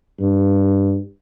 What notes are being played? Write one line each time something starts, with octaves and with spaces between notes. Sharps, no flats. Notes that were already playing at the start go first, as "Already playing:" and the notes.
G2